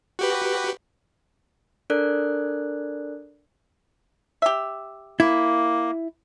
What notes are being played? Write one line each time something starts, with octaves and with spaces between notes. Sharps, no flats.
F#4 G4 B4
D4 A4 A#4 D5 F#6
G4 E5
A#3 E4